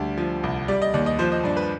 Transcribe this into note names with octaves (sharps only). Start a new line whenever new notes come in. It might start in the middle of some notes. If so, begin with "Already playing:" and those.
Already playing: D2 G3 D5
F3
C2
G3 D5
D#5
D#2 D5
D#5
F3 C5
D#5
G2 D5
B4